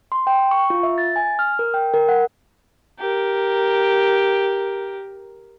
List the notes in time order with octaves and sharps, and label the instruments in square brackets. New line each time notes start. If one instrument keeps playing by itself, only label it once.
[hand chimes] C6
G5
C#6
F4
E5
A6
G#5
F6
A#4
G5
A#4
F#5
[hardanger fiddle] G4 A#4